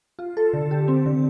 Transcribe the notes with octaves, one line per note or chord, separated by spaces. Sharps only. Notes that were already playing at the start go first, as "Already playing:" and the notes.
F4
A4
D3
G4
C4
D3